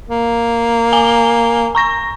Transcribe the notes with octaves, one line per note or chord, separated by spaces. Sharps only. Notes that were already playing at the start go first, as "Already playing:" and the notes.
A#3
G#5 G7
A#5 C#6 A#6